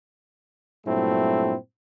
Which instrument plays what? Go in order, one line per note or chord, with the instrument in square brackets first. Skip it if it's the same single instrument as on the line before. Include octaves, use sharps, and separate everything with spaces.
[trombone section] G2 A#2 F#3 A3 C4 E4